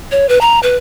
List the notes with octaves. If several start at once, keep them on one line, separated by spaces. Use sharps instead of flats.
C#5
B4
A#5
B4